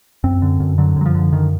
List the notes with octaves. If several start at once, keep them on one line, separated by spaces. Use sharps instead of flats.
F#2 C4
D3
F#2
D3 F#3
F#2 F#3
F3
D3
F#2 D#3